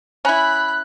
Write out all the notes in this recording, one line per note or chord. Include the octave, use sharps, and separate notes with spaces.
C#4 E4 B5 F#6